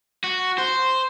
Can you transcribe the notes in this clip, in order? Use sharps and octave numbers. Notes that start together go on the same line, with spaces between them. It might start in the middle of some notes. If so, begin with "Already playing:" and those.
F#4
C5